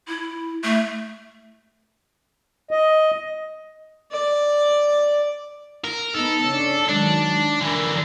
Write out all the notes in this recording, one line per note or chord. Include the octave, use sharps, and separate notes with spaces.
E4
A3
D#5
D5
A#4
B3 D#4 A4
C#3 C#4 D4
D#3 F#3 G#3 D4
D3 E3 A#4